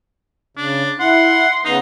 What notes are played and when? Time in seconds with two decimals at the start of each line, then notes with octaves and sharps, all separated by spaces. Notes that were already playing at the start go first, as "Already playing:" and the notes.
0.57 C#3 D4
1.00 E4 F#5 C6
1.65 C#3 B3 D#4